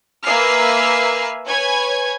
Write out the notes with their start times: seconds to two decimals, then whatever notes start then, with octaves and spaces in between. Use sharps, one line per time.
0.24 A#3 B4 E5 G#5 F6 C7
1.47 B4 C#5 G#5 G#6